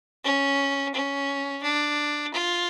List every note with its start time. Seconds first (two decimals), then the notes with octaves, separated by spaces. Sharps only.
0.24 C#4
0.94 C#4
1.63 D4
2.33 F4